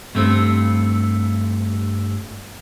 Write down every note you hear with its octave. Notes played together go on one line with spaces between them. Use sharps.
G2 A3 C4